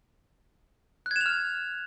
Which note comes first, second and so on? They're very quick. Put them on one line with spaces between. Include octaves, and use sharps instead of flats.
F#6 G#6 E7 F7 F6